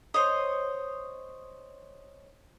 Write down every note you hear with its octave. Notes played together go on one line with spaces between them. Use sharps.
C5 C#5 D#5